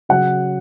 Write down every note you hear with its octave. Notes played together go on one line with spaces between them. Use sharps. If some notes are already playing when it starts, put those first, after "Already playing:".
C#3 F#3 F#5